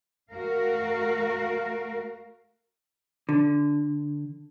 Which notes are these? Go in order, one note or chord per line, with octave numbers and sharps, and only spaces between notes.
A3 F#4 A#4 F5
D3